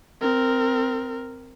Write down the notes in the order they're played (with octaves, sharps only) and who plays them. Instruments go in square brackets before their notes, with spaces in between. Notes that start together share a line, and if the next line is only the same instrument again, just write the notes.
[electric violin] C4 A#4